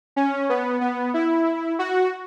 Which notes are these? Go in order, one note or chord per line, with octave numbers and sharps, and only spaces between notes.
C#4
B3
B3
E4
F#4